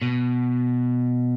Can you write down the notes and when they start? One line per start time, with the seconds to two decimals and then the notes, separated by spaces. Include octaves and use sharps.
0.02 B2